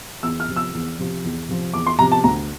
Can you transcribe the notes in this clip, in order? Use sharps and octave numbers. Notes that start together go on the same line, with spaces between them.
E2 E6
F6
C3 F3
E6
E2
C3 F3
E2
C3 F3
E2 D6
C6
C3 F3 A#5
A5
D2 A#5